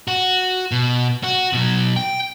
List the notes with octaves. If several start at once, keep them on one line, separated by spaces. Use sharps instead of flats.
F#4
B2
F#4
B2 F#3
G5